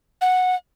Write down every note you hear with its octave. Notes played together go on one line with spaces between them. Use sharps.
F#5